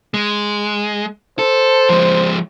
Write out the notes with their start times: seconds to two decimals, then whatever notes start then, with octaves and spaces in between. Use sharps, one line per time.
0.14 G#3
1.39 A4 C5
1.89 F3 G#3